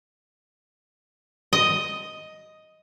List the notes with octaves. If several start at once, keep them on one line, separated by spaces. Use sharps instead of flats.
D#5